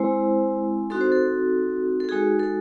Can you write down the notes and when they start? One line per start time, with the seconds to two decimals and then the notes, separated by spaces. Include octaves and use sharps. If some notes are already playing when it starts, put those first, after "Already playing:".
Already playing: G#3 C4 E4 C5
0.90 C4 D#4 F#4 A4
1.01 C5
1.12 A4
2.00 A4
2.09 G#3 D#4 F#4 G#4
2.39 A4